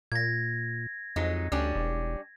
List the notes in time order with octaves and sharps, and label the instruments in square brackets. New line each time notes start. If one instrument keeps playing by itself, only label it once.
[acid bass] A#2 [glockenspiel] G#6 A#6
[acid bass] F2 [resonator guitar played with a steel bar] F#3 G#3 D#4
[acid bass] D2 [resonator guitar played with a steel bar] G3 C#4 D4
[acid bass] E1